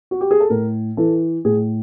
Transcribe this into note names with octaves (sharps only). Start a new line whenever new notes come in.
F#4
G4
G#4
A4
A2 A#4
E3 A4
A2 G#4